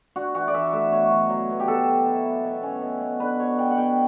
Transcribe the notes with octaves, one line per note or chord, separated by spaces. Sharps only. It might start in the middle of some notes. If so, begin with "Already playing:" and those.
D4 F#4
E3 F#4
D5
E3 E5
A3 E5
B2 C#5
F#3
F#3
B2
G4
B3 A4
F#3
E4
B3
B2
C#4
B2
B2
D4 B4
F#3 C#5
B3 G5
F#5
B2 G5